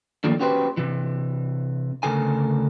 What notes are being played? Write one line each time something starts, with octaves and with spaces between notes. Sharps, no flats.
D3 D#3 F3 G3 A3 A#3
C#4 F#4 G4 B4 C5
C3 E3
D2 G2 C#3 A4 A#4 G#5